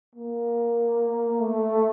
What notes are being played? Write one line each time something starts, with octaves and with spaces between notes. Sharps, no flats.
A#3
A3